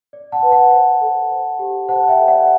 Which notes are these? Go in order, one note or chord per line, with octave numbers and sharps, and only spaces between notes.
D5
F#5 A5
B4
F#5 A5
C5
A4
C5
G4
C5 F#5 A5
E5 G5
A4
D5 F#5